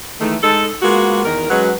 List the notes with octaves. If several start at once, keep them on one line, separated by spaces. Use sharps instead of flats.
D#3 E3 G#3 A3
G#3 D#4 A4
G#3 A#3 B3 F4 F#4
E2 D#3 A#4
F#3 G#3 C#4 F#4 B4